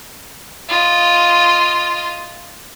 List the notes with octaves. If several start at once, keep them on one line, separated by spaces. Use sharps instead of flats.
F4 D#5